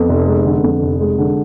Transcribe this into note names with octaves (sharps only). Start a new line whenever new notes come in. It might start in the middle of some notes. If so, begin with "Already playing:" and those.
Already playing: F2 B3
F1
G#3
D3
F2
F1
G#3
D3